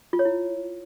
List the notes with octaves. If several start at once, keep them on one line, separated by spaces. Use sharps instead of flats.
F4
C#5
E4